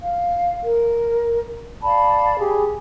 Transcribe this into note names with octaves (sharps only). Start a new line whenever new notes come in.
F5
A#4
D5 F5 A5 B5
G4 G#4